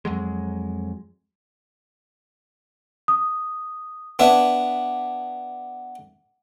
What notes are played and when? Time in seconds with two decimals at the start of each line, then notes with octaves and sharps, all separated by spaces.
0.05 F2 F#3 G#3
3.08 D#6
4.19 B3 D4 E4